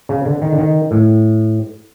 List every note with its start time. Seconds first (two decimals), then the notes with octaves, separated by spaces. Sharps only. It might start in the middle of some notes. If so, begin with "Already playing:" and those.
0.09 C#3
0.26 D3
0.42 D#3
0.53 D3
0.58 D#3
0.91 A2